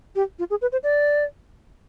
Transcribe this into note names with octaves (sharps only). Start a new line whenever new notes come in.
G4
F4
G#4
B4
C5
D5